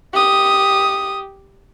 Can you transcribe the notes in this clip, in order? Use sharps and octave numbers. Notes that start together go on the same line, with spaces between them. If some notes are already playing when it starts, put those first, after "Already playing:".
G4 D#6